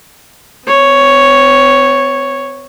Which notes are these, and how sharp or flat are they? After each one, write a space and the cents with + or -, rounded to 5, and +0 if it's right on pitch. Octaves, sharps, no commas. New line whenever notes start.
C4 -45 C#5 +0